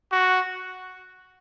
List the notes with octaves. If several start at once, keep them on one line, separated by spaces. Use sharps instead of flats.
F#4